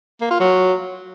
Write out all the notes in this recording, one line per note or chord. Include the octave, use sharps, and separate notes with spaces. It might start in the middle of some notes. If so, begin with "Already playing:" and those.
A#3
F4
F#3